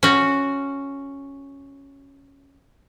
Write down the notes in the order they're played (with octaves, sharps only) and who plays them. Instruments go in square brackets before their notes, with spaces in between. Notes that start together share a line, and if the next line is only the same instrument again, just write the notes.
[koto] C#4 F#4